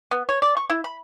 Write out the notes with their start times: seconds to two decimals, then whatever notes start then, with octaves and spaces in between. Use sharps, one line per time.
0.11 B3
0.29 C#5
0.42 D5
0.57 C#6
0.70 E4
0.84 B5